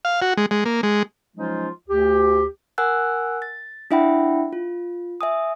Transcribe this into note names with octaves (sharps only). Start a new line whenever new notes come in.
F5
F#4
G#3
G#3
A#3
G#3
F3 F#3 G#3 C#4 D#4 F4
D2 G4
A#4 F#5 G#5 E6 F#6
A6
D4 E4 E5 F#5 G5 B5
F4
E5 G#5 D#6